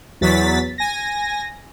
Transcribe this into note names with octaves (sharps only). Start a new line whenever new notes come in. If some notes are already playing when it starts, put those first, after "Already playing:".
E2 F#3 A6 B6
G#5 A#6